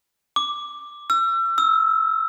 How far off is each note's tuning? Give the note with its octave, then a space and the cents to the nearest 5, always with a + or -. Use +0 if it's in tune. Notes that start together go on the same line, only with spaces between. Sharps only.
D6 +5
E6 +40
E6 -20